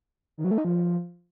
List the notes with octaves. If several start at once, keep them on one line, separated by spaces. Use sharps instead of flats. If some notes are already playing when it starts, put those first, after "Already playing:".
D#3
F#3
A3
D#4
F3